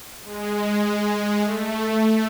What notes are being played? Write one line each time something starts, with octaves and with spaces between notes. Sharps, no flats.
G#3
A3
A3